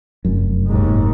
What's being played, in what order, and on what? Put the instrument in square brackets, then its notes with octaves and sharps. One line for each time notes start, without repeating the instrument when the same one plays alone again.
[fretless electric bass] F1 F#2
[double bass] D#2 G#2